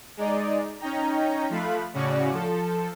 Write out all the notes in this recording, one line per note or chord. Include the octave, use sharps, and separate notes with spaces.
G#3 D#4 D5
C#4 D#4 G5 A#5
F3 A3 F5 B5 F#6
A2 C#3 C#4 F#4 D5 C#6
F3 A4